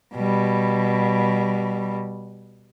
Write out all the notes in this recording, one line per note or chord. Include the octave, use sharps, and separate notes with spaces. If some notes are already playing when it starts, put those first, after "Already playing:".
B2 G3